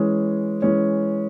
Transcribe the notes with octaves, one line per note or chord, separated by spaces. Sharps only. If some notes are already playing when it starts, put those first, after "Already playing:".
Already playing: E3 G#3 C#4
E3 G#3 C#4